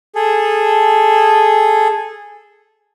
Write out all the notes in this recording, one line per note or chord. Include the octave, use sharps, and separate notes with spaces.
G#4 A4